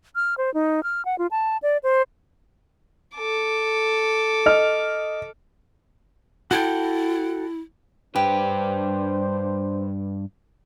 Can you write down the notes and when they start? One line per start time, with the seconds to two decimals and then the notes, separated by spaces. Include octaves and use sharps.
0.15 F6
0.38 C5
0.54 D#4
0.83 F6
1.05 F#5
1.18 F4
1.31 A5
1.62 D5
1.83 C5
3.16 A4 D6
4.46 D#5 F6
6.51 E4 F#4 A4 G5
8.16 G2 D4 G4 B4 C5